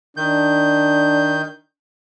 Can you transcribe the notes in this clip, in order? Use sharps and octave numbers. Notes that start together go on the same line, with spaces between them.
D#3 D4 G6